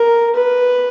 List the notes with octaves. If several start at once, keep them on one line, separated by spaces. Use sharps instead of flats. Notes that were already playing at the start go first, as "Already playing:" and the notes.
Already playing: A#4
B4